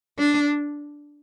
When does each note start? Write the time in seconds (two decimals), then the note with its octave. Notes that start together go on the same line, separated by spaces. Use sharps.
0.18 D4